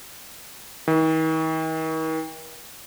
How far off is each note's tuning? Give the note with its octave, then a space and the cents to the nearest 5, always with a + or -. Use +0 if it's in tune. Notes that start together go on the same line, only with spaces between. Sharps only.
D#3 +45